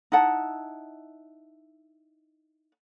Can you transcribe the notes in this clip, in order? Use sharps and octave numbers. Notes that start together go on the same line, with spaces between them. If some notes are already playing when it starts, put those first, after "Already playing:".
D#4 E4 F#5 A5